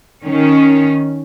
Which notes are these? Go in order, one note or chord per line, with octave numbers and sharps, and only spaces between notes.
D#3 C#4